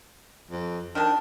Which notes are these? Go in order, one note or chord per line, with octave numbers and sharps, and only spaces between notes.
F2
D#3 D4 F#4 A5